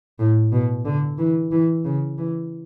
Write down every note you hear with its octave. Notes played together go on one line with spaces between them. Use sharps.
A2
B2
D3
E3
E3
C#3
E3